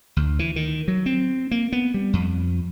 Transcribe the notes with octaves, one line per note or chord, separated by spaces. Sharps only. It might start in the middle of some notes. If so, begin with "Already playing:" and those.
D2
E3
D#3
F#3
C4
A#3
B3
G3
F2